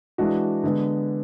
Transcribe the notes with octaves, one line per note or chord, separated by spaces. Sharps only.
E3 G#3 D4 F#4
D3 G#3 B3